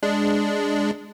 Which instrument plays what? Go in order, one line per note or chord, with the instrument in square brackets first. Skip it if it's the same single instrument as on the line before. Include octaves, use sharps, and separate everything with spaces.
[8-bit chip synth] G#3 D4